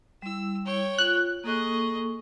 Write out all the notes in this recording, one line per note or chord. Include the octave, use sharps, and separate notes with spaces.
G3 E4 E6
C#5 G5
F4 F#6
A#3 G#4 A4 D#5 C#6